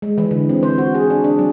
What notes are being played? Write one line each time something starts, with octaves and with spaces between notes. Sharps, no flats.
G#3
E3
D3
C4
C5
F#4
G#4
D4
D4
F#3